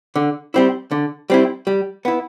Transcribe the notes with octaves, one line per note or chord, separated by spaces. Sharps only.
D3
G3 C4 E4
D3
G3 C4 E4
G3
B3 E4